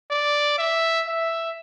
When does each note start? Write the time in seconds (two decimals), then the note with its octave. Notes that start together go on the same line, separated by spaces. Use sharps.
0.10 D5
0.58 E5
1.07 E5